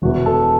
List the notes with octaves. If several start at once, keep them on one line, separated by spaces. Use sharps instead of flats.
E1 E2 E3 F#4
A4